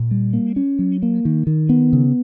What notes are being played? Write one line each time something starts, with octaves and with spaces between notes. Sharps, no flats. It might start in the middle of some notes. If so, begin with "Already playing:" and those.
Already playing: A#2
G3
A#3
C#4
F#3
A#3
D#3
D#3
B3
C#3